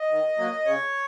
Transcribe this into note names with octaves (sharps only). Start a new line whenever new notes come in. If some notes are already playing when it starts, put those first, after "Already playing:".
Already playing: D#5
D#3
F#3 A#3
C#3 C#5